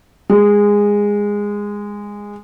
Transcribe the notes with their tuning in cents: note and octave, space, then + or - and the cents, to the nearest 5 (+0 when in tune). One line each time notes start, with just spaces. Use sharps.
G#3 -15